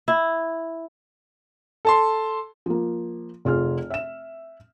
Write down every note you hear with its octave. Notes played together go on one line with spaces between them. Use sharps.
E4
A4 A5 C6
F3 A#3
F1 F4 G#4 F6
E5 E7